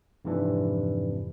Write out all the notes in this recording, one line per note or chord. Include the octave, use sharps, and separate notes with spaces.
F2 G#2 C3 E3 D4